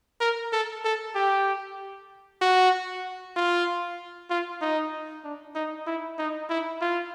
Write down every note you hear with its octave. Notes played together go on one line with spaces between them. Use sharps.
A#4
A4
A4
G4
F#4
F4
F4
D#4
D4
D#4
E4
D#4
E4
F4